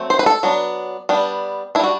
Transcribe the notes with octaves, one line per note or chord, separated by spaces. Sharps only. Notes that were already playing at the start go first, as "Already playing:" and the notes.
Already playing: F#3 A3 C4
C5
B4
A4
F#3 B3 D4
G3 B3 D4
G3 D4 E4 F#4